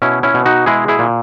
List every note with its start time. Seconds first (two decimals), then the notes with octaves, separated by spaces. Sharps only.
0.02 B2 C#4 E4
0.23 C#4 E4
0.34 B2
0.46 D#4 F#4
0.66 G#3 E4 G#4
0.88 E4 G#4
0.99 A#2